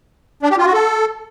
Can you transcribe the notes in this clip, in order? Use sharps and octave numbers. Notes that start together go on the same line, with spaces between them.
D4
G4
F4
F#4
A4